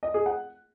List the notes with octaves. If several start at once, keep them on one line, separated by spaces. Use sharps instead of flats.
D#5
G#4
F#5